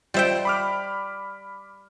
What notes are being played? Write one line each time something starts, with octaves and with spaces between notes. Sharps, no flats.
G3 F4 C5 E5 G5
B5 D6 F6